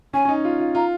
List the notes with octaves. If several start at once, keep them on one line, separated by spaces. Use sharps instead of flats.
C#4 G#5
C#4
D#4
F4
F4
F4 A#5